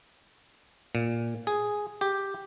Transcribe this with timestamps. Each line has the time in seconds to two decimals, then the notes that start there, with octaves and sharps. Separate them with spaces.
0.95 A#2
1.47 G#4
2.01 G4